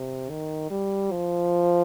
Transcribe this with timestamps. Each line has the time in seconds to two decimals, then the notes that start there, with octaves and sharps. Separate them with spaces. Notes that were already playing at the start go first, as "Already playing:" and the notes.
Already playing: C3
0.30 D#3
0.70 G3
1.12 F3